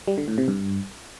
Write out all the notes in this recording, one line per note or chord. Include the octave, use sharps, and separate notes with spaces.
G3
D3
A2
C3
G2